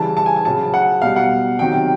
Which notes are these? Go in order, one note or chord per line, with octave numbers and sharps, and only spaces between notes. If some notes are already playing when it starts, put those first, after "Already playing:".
Already playing: C#3 E3 G3 A5
A5
G#5
G#5
C#3 F#3 A5
F#5
B2 G3 F5
F#5
C3 D#3 F#3 G5